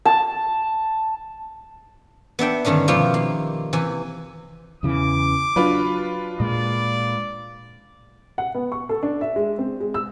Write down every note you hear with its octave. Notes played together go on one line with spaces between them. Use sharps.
A5
B3 D4 E5 G5
G2 D3 D#3 C#4 D4
B2 D#3 F3 E4 F4 G4
A#3
C3 E3 G#5
E2 C#3 E3 D6
F#3 D4 F4 B4
A#2 G#3 D5
F#5
B3
C#6
A4
D4
E5
G#3
C4
G#3
E6